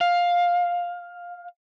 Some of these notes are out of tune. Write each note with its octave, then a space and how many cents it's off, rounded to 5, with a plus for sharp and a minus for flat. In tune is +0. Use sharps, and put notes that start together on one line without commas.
F5 +10